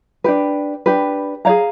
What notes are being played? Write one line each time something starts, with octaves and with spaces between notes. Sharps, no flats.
D4 G4 B4
D4 G4 B4
G#4 C#5 F5 A#5